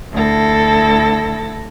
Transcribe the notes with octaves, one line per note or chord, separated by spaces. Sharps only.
D2 E4 A4 A#6